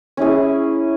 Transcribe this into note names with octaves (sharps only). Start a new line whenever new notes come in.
C#4 E4 G#4